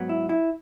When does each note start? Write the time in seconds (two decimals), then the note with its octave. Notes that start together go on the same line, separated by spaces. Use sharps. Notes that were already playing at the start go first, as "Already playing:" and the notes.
Already playing: G#2 F#3 B3
0.09 E4
0.29 E4